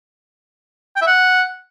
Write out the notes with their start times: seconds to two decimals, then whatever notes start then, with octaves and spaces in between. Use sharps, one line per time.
0.96 G5
1.01 E5
1.07 F#5